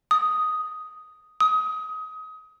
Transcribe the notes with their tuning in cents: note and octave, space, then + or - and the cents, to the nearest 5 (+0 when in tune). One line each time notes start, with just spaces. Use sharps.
D#6 +5
D#6 +25